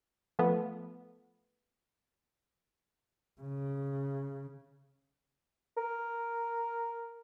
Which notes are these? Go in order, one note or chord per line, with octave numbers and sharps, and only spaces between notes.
F3 A3 B3
C#3
A#4